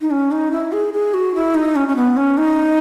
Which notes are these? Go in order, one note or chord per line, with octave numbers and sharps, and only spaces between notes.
D#4
C#4
D#4
E4
G#4
G#4
F#4
E4
D#4
C#4
C#4
B3
C#4
D#4